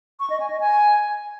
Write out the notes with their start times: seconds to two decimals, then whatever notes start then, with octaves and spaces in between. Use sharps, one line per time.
0.20 C#6
0.30 D#5
0.40 G#5
0.50 D#5
0.60 G#5